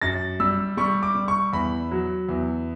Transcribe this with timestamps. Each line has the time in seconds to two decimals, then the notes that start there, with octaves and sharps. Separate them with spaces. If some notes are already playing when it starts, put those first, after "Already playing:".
0.02 F#2 A6
0.40 G3 E6
0.77 G3 C#6
1.03 D6
1.15 G3
1.28 C#6
1.53 E2 B5
1.91 F#3
2.29 E2